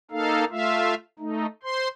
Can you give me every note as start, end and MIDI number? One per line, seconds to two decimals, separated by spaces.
0.11 0.44 58
0.11 0.44 63
0.11 0.44 69
0.11 0.44 77
0.51 0.94 57
0.51 0.94 65
0.51 0.94 76
0.51 0.94 77
1.19 1.46 57
1.19 1.46 63
1.63 1.88 72
1.63 1.88 84